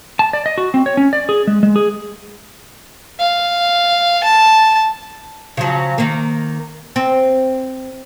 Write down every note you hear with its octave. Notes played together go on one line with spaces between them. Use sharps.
A5
D5
D#5
F#4
C4
C#5
C#4
D5
G#4
G#3
G#3
G#4
F5
A5
C#3 F3 F#3
D#3 A#3
C4